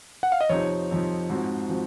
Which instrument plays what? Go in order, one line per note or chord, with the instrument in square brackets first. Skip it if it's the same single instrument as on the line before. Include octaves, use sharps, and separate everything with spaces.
[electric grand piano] F#5
F5
D#5
[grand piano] F2 C3 F3 C4 D#4 [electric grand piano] C#5
[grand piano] F2 C3 F3 C4 D#4
G#2 F3 C4 F#4
F3 C4 F#4